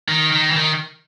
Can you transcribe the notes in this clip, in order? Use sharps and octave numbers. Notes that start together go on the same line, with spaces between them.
D#3
D#3
E3
D#3